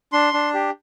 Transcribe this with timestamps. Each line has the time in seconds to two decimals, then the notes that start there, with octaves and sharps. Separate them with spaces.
0.13 D4 C6
0.33 D4
0.54 G4